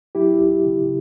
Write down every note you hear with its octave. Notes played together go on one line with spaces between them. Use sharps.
F#3 E4 G4
C#2
C#3